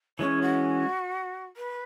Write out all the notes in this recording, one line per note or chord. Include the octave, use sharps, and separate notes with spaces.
E3 G#3 C#4 C#5
F#4
B4